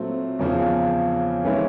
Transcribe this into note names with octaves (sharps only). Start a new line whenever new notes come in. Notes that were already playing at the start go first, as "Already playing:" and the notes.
Already playing: A#2 F#3 A3 C4
E2 C#3 F3
E3 G#3 C#4 E4